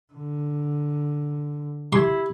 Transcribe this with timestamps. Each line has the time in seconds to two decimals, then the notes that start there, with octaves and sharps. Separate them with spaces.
0.13 D3
1.93 E4 G4 C6 G#6